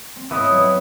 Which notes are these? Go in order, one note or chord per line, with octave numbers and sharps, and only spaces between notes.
C4
G#2 E3 B3 C#5 D#5
E2 F#3 A5